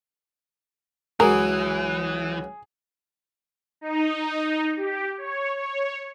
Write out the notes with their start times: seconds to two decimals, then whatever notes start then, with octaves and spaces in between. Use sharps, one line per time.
1.20 C#2 E3 F#3 G#4 A#4
3.81 D#4
4.77 G4
5.18 C#5
5.56 C#5